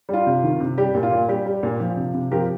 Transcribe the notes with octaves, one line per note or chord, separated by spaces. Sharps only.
G3 F4
C3
D#3
C3
G3 G4
A#2
F4
A#2
G3 G4
G3
A#2
F3
C3
C3
F3 G4 A#4